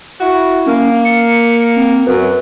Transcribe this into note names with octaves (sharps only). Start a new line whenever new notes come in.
E4 F#4
A#3 C#4
C#7
C4
F#2 B4